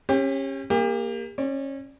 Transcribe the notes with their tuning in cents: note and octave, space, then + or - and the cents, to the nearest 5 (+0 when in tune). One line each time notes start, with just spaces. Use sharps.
C#4 -25 G4 +25
A#3 +0 G4 +40
C#4 -25 D5 +5